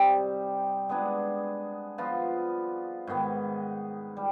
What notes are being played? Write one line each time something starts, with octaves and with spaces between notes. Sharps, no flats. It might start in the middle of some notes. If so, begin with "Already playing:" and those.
Already playing: C3 G3 C4 D#4
G#3 B3 D4 G#4
F3 B3 F4
G#2 D#3 B3
G3